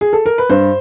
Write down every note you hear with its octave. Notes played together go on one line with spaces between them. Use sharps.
G#4
A4
A#4
B4
G2 C5